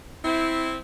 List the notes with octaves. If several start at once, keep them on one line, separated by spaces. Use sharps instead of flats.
C4 E4